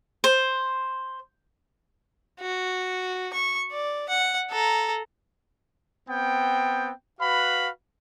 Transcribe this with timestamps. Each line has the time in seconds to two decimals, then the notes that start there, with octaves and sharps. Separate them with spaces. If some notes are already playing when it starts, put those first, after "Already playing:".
0.24 C5
2.40 F#4
3.33 C#6
3.71 D5
4.09 F#5
4.50 A4 A#5
6.08 B3 C4 G5
7.21 F#4 B4 F5 B5